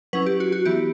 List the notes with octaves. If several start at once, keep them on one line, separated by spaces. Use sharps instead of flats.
F#3 C#4 E4 B4
G4
F#4
F#4
E3 B3 E4 G4